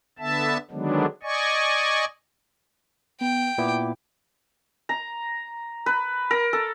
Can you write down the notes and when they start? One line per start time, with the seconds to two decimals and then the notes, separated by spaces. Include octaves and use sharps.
0.19 D3 B3 E5 A5
0.71 D3 D#3 F#3 G#3 B3 D4
1.23 D5 D#5 G#5 C#6
3.21 B3 G5
3.58 A#2 B3 E4 D6
4.89 A#5
5.86 B4
6.31 A#4
6.53 A4